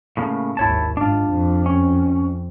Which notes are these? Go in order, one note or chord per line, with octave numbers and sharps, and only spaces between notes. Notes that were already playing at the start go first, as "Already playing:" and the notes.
A2 C#3 A#3
G#1 D#2 E4 C#5 A5
G#2 D4 F4
F2
C#4